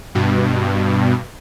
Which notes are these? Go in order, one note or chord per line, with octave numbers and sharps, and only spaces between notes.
G2 B2